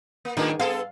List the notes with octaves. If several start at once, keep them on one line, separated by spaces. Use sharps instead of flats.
A#3
A2 D#3 G#3 D4
B3 G#4 A4 F5